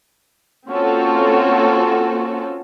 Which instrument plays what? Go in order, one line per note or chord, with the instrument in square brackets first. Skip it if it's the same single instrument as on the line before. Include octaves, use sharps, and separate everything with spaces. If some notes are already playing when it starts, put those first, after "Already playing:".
[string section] A#3 C4 C#4 F4 F#4 A4